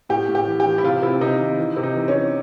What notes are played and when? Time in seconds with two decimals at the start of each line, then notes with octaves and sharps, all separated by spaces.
0.09 A2 G4
0.28 A2
0.35 G4
0.47 E3
0.60 G4
0.66 E3
0.78 E4
0.84 C3 F4
1.02 C3 E4
1.21 C3 D#4
1.39 D#3
1.58 E3
1.77 C3
1.83 D#4
1.95 E3
2.08 C#4
2.13 E3